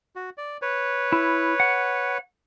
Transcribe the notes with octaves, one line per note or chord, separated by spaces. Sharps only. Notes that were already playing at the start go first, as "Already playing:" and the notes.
F#4
D5
B4 C#5
E4
F#5